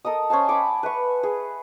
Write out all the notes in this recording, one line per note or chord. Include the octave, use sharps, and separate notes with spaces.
A4 A#4 D#5 D#6
C#4 C5 G#5 A5
F#5 B5 C#6 D6
B4 E5 C#6
G#4